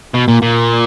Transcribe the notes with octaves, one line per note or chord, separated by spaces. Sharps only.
B2
A#2
A#2